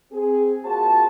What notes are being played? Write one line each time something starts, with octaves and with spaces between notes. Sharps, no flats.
C4 G#4
A#3 F4 F#4 C5 A5